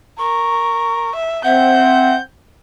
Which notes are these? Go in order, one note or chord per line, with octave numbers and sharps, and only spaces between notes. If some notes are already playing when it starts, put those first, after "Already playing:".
A#4 C#6
E5
C4 E5 F#5 G6